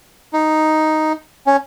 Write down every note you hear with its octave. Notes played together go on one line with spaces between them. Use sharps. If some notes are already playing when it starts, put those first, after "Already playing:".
D#4
C#4